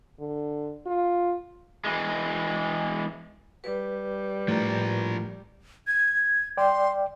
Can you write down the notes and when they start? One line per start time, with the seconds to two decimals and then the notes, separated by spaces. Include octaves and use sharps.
0.20 D3
0.86 F4
1.84 E3 G#3
3.64 G3 B4
4.48 A2 F3 A#4
5.87 G#6
6.57 D5 G5 C6